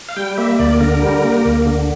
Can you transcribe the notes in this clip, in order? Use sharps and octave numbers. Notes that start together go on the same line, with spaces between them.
F5
G3 G5
A#3 E5
D2 D5
D3 A#4
G3
A#3
D2
D3